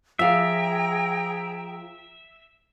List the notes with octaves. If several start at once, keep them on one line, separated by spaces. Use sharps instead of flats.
F3 G#4 E5 F5 G5 A#5